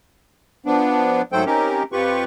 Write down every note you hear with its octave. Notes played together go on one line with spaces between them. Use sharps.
F3 B3 D4
G#2 F#3 A3 A4 C5 G5
C4 C#4 D#4 G4 A#4
F2 F4 G4 B4 C#6